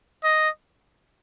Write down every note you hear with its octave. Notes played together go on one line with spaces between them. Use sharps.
D#5